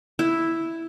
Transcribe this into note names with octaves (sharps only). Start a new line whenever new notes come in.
E4